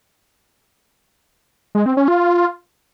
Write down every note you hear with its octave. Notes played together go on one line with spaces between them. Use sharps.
G#3
C4
C#4
F4